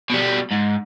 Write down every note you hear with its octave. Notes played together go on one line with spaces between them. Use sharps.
B2 G3
G#2